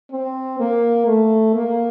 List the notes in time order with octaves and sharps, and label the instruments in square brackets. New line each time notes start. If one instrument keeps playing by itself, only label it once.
[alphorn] C4
A#3
A3
A#3